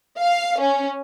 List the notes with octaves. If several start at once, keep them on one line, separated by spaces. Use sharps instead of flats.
F5
C#4